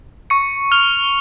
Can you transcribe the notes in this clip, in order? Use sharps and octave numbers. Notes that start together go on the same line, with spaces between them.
C#6 C#7
F6 F7